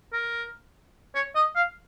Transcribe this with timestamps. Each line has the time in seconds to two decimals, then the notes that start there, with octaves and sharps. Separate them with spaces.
0.13 A#4
1.15 C#5
1.35 D#5
1.56 F5